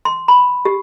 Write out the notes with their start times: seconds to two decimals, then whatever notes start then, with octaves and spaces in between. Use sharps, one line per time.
0.05 C6
0.28 B5
0.65 G4